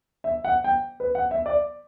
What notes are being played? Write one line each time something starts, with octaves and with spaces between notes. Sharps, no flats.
E5
F#5
G5
B4
F#5
E5
D5